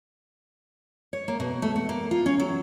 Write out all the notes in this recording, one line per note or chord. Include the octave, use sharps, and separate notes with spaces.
C#5
A#3
B2
A3
F#5
A#3
F4
C#4
F#3